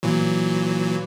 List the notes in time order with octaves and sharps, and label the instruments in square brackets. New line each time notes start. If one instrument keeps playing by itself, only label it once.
[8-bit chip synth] A#2 E3 F#3